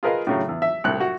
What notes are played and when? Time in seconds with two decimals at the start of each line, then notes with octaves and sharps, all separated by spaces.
0.03 F4 G#4 A#4 B4 D#5 F5
0.27 A2 C#3 F#3
0.49 E2
0.62 E5
0.84 C2 A2 F#6
1.00 F#4